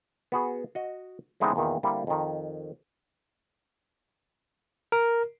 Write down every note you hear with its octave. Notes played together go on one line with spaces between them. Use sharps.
B3 F#4 G#4
F#4 D#5
D3 E3 G#3 B3 C4 D#4
E2 A#2 D#3
D3 G3 A#3 C4 E4
F2 D#3
A#4